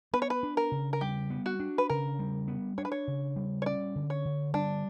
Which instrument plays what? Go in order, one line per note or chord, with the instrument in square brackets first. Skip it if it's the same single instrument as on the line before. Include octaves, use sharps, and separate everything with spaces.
[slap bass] B3 [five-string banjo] B4
[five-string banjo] C#5
B4
[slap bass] D4
[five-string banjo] A#4
[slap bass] C#3
[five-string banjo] A#4
[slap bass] G3 [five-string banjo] G4
[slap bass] B3
[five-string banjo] F#4
[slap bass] D4
[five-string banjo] B4
[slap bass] C#3 [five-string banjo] A#4
[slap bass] G3
B3
[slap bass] D4 [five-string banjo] C#5
[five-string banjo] B4
C#5
[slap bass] C#3
G3
[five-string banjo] C#5
[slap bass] C#4 [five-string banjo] D5
[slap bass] D3
[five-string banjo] C#5
[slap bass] D3
[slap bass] G3 [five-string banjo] D4